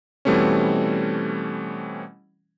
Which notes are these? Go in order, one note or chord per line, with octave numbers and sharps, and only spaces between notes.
B2 E3 G3 A3 C4 C#4